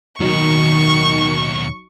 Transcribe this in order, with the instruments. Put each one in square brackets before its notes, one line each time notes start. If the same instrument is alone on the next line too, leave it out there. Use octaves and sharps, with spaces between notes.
[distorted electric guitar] D#2 B2 [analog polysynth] D#3 [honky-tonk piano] F#3 D#4 [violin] C#6